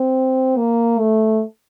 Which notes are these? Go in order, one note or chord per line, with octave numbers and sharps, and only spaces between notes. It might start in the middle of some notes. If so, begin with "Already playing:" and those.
Already playing: C4
A#3
A3